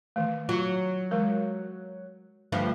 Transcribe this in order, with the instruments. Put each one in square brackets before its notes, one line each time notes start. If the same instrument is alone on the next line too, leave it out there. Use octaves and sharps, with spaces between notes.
[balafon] D#3 E3 A3
[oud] F#3 [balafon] F4
[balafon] E3 G#3 A#4
[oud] D2 G2 F3